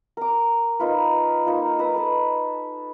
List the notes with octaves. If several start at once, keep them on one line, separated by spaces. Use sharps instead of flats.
A#4 D6
D#4 F4 B4
A#3 D#4 F4
B4 A#5 D#6 E6
D#4 A4 B4